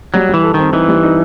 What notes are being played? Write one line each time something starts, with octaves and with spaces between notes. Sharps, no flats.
F#3 G3
E3 G3
A4
D#3 C4
E3 D#4
G3
D#4